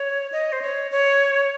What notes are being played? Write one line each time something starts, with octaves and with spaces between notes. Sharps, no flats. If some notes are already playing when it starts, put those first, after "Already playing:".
Already playing: C#5
D#5
C5
C#5
C#5